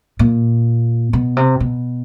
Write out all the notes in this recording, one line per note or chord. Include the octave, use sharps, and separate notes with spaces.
A#2
B2
C3
B2